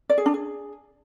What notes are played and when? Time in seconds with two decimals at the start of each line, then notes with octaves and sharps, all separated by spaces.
0.09 D5
0.18 G#4
0.26 D4
0.34 G#4